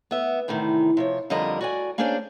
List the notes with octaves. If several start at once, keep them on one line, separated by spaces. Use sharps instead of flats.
B3 E5
E2 A2 C3 D#3
C3 F3 C#5
F2 D3 G3 A#4 D#5 A#5
F#4 D5 G#5
A#3 C#4 D4 G#4 C5 D5